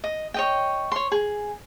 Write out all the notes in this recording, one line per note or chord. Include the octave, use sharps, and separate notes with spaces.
D#5
C#5 D#5 G5
C#5 C6
G#4